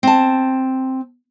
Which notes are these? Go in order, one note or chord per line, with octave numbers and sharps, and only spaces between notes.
C4 A5